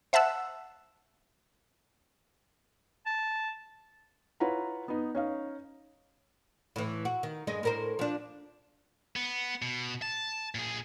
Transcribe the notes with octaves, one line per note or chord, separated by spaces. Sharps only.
C5 E5 F#5 A5 E6 F#6
A5
E4 F4 B4 C#5 F#5 A#5
B3 D#4
C#4 D#4 F5
A2 E3
F#4
D#3
G2 G#3 D#5
A2 A#4 C5
F3 D4
B3
B2
A5
A#2 G#4